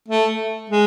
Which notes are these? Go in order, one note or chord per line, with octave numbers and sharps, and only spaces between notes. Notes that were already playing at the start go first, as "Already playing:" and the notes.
A3
G#3